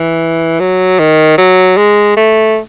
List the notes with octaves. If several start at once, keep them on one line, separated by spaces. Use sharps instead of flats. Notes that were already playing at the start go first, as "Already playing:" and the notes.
Already playing: E3
F#3
D#3
F#3
G#3
A3